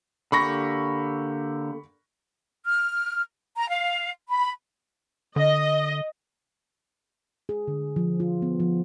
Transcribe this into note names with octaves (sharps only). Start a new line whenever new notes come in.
D3 A#3 G4 B5 C#6 A#6
F6
A#5
F5
B5
D3 D#5
G#4
D3
F3
F4
B3
F3